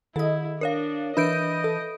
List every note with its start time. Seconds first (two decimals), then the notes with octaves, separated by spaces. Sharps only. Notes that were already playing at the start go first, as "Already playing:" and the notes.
0.16 D#3 E4 A4 D#5
0.61 D4 A#4 C#5 F5
1.17 E3 D4 B4 D#5 E5 B5 G6 D7
1.64 A4